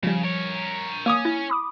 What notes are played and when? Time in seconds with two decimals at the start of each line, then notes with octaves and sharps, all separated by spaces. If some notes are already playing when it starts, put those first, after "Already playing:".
0.03 C#3 F3 G3
0.23 A#4 C#5
1.06 A#3 C#4 D6 D#6
1.25 E4
1.50 B5 D6 D#6